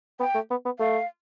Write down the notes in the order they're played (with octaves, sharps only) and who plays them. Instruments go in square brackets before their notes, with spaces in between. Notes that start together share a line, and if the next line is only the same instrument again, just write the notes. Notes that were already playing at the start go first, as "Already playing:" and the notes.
[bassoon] B3 [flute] G5
[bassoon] A3
B3
B3
[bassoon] A3 [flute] F5